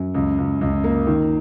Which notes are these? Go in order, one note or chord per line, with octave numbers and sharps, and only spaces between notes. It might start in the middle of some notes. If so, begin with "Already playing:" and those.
Already playing: F#2
C#2
C#2
C#2
A#3
D#3